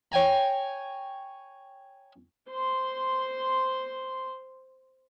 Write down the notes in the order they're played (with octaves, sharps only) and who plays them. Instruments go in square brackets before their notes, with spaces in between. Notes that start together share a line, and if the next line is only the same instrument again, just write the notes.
[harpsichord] C#5 G5 G#5 A#5
[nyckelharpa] C5 C6